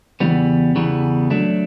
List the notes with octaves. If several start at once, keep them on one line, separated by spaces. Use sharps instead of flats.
E2 C#3 E3 G3 B3
E2 C#3 E3 G3 B3
F#3 A3 D4